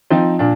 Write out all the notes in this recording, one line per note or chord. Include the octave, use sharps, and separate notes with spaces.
F3 C4 D#4
A#2 D4